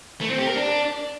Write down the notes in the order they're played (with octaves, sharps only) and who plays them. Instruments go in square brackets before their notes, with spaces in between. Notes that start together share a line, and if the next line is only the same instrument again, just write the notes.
[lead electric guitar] A3
C4
G4
A#4
D4